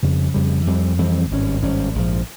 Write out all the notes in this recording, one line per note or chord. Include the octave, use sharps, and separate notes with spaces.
F2 C#3 G3
F2 C#3 G3
F2 E3 G3 C4
F2 E3 G3 C4
G#1 G2 G3 C#4
G#1 G2 G3 C#4
A#1 G#2 F3